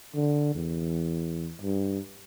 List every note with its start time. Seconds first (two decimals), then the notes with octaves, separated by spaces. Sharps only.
0.15 D3
0.55 E2
1.61 G2